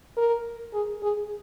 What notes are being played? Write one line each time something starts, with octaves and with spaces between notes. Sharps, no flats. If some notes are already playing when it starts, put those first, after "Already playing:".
A#4
G#4
G#4